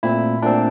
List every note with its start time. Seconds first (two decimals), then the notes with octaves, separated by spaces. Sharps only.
0.03 A#2 A3 C4 E4
0.42 A#2 A3 C4 D4